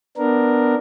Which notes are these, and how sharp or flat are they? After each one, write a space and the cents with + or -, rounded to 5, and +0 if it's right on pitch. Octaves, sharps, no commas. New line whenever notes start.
B3 +0 D4 +0 A#4 +0